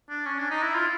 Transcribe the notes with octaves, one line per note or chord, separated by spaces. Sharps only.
D4
C#4
D4
D#4
E4
F4